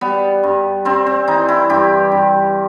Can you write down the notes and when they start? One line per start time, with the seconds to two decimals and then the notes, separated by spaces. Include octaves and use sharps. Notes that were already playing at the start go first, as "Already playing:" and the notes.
0.01 G3 B3
0.43 G2
0.85 G2 C4
1.06 C4
1.27 E3 D#4
1.49 E4
1.69 G2 G4
2.12 G2